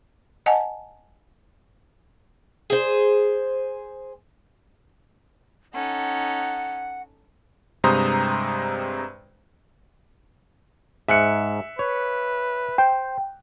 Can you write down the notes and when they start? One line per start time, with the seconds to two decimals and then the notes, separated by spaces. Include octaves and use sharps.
0.46 D#5 F#5 G#5 A5
2.70 G#4 C5
5.74 C#4 D#4 A4 F#5
7.84 G2 C3 G#3 C5 A#5 D#6
11.09 G#2 E5 F#6 C#7
11.79 B4 C#5
12.78 C5 G5